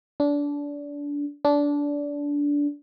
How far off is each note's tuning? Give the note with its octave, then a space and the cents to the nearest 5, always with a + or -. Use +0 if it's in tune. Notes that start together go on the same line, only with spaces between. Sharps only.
D4 -25
D4 -20